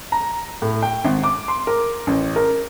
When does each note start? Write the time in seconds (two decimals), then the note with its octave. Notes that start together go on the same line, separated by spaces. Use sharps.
0.12 A#5
0.62 A2
0.82 G5
1.05 G#1
1.24 D6
1.48 C6
1.67 A#4
2.07 A1
2.36 A#4